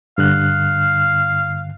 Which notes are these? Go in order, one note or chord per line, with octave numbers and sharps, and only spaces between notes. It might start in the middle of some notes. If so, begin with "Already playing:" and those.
G2 D3 F5 F#6